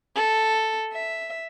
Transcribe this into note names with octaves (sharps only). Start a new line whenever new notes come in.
A4
E5